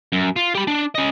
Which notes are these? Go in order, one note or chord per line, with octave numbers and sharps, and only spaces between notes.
F#2
F4
G4 B5
D4
C#4 D#5